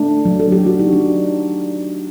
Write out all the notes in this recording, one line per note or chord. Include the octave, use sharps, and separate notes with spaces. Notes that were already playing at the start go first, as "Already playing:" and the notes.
Already playing: A3 D4
F#3
A4
G4
A3
F#4
D#4
F#3 D4